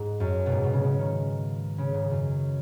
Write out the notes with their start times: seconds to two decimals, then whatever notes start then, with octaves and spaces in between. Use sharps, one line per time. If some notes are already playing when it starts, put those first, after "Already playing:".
Already playing: G#2
0.20 F#2
0.46 B2
0.52 G#2
0.63 B2
0.73 C#3
0.84 C#3
0.99 D#3
1.78 C#3
1.94 G#2
2.10 F#2